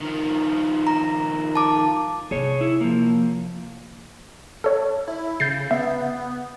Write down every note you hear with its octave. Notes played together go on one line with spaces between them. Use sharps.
D#3 F3
A#5
A5 D6
C3 G#4 C#5
E4
F3 A#3
A4 C#5
E4
C#3 G6 A6 C7
B3 E5